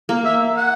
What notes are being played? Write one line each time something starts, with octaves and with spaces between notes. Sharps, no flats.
A#3
E5
F#5